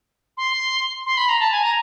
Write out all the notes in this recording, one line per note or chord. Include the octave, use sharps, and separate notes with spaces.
C6
C6
B5
A#5
A5
G#5
A#5